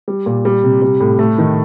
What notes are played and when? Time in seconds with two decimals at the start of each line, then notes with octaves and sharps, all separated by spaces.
0.08 G3
0.26 A#2
0.45 G3
0.64 C3
0.82 G3
1.00 A2
1.19 A3
1.38 D#3